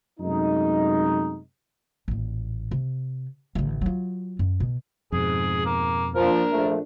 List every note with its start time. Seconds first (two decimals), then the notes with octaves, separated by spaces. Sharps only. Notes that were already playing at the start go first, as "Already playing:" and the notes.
0.20 F#2 C3 G#3 A3 D#4
2.08 A1 A#2
2.71 C3
3.55 A1 D3
3.81 F#3 F4
4.39 F#2
4.60 B2
5.12 F2 G#2 B2 G#4
5.66 A#3
6.15 F3 A#3 D4 A#4
6.52 A#1 F3 A3